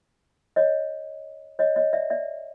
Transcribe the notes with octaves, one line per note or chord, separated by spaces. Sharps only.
C#5 D#5
C#5 D#5
C#5 D#5
D5 E5
D5 E5